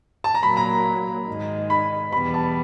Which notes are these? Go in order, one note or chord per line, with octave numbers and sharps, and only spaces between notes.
A5
A#5
A#2 F#3 A#3 B5
A#5
G#2 D#3 G#3
B5
E2 B2 G3 B3 B5
A5